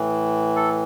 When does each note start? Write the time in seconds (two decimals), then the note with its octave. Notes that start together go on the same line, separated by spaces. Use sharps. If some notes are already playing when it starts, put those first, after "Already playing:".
Already playing: A2 E3
0.56 A4